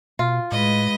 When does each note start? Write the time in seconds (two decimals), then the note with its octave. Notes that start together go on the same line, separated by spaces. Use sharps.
0.19 B2 F4
0.52 A2 G#3 B4 D#5